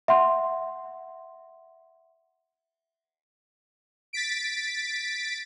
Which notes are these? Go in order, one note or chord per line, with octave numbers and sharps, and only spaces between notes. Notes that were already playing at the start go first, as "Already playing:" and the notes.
E5 F#5 C6
A6 B6 D7